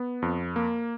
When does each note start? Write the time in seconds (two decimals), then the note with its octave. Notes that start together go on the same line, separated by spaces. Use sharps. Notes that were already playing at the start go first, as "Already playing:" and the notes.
Already playing: B3
0.22 F2
0.56 A#3